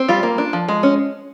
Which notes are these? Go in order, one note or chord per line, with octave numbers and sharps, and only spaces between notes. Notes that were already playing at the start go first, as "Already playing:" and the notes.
Already playing: C4
G3 F4
A#3
D4
F3
G#3
C#4